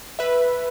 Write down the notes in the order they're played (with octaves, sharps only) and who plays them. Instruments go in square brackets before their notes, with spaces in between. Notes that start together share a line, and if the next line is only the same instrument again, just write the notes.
[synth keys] B4 E5